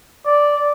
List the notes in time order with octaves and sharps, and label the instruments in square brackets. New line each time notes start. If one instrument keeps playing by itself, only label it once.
[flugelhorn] D5